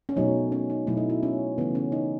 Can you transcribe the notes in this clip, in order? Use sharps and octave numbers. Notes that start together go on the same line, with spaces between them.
C#4
B2 F#3 A3 D#4
C#4
D#4
B2 F#3 A3 E4
D#4
E4
C#4
C#3 E3 A3 B3
C#4
D#4